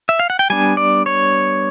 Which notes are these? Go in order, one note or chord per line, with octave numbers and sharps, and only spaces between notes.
E5
F5
F#5
G5
G3 B3 D4 G#5
D5
C#5